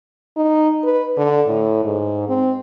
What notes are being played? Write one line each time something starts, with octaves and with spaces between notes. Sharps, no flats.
D#4
B4
D3
A2
G#2
C4